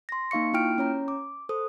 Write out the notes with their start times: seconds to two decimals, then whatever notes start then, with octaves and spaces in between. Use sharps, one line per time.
0.09 C6 A#6
0.31 A#3 D#4 F5 C#6 C#7
0.53 A#3 E4 F4 G5 F6 D7
0.78 C#4 C#5 A#5
1.08 D6
1.49 A4 C5 D#6